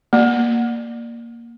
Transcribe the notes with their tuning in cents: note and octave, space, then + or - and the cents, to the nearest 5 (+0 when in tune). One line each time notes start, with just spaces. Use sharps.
A#3 +0 D5 +15